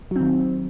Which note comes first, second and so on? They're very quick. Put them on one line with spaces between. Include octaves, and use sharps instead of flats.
F#3 C4 D#3